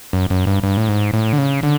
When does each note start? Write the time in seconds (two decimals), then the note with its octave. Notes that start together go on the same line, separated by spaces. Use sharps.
0.13 F#2
0.30 F#2
0.47 G2
0.63 G2
0.77 A2
0.89 G#2
1.13 A2
1.33 D3
1.38 C#3
1.63 D3